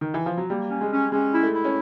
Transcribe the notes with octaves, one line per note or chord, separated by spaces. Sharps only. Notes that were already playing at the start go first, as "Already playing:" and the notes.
D#3
E3
F3
F#3
G3 A#3
C#4
G#3
C#4
G#3 C#4
E4
A3
E4
C#4